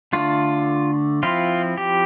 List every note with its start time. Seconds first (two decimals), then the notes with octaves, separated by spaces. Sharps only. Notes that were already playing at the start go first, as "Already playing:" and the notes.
0.13 D3 A3 D4 F4
1.23 F3 C4 E4 F4
1.78 G4